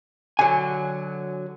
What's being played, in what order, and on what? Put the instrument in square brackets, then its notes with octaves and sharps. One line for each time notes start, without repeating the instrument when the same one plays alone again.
[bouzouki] D3 F#3 [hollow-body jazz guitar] G#5